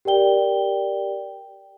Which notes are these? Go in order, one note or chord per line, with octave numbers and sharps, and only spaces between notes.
G4 A#4 D5 G5 G7